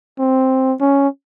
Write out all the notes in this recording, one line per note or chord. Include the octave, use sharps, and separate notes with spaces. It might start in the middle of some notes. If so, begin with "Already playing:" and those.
C4
C#4